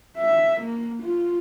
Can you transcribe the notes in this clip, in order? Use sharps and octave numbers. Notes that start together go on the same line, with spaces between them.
E5
A#3
F4